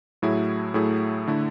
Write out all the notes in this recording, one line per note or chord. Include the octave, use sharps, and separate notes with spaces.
A2 F#3 A3 E4 G#4
A2 F#3 A3 E4 G#4
D3 A3 E4